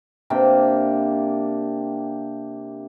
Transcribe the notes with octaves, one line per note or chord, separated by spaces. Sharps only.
C3 A#3 D4 G5